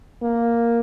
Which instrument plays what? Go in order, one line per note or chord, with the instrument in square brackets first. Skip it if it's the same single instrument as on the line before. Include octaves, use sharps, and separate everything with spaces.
[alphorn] A#3